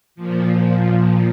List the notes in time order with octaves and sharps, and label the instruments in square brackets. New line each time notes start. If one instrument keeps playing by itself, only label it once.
[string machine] A#2 F3